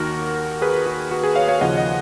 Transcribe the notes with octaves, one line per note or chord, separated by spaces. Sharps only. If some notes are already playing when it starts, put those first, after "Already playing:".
Already playing: D#2 D#3 A#3 F#4 A#4
G#4 B4
F#4
F#4
G#4
C#5 F5
C#5 F5
D#2 C#3 F3 D#5 F#5
D#5 F#5